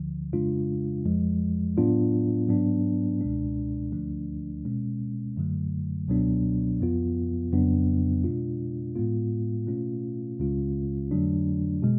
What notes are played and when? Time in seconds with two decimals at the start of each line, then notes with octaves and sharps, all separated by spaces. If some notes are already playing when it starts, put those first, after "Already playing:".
Already playing: D2 D3 F3
0.33 F2 C#3 G#3 D4 F4
1.05 F2 F3 G#3
1.77 A2 F#3 B3 D4 F4
2.48 G#2 F#3 B3 D4
3.21 C#2 B2 G#3 D4
3.92 D2 D3 F3 A3 D4
4.65 B2 G#3 C#4
5.37 F#2 D3 F#3 A3
6.08 C#2 B2 F#3 B3 D4
6.80 F2 F3 B3 F4
7.51 F2 C#3 F#3 B3 D4
8.24 B2 G#3 D4 F4
8.96 A2 G#3 B3 F4
9.67 B2 A3 C#4 F4
10.39 C#2 C#3 G#3 C#4 F4
11.11 F2 D3 F#3 A3 D4
11.83 B2 G#3